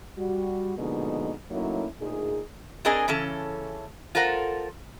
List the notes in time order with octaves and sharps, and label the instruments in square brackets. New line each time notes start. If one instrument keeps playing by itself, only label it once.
[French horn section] G3 F#4
B2 D3 F3 G#3 A#3 D#4
F#3 A3 A#3 C#4 D#4 E4
D2 A#2 D#4 G#4
[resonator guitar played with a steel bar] C4 D4 G#4 A#4 D#5 G#5
C#3 E3 C#4 A4
F4 A4 A#4 C5 F#5